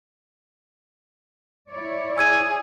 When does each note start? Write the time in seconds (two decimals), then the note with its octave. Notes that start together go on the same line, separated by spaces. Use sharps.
1.69 E4 C#5 D5
2.18 G#4 E6 G#6 D#7